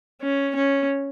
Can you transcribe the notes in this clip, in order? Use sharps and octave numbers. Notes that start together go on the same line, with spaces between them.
C#4
C#4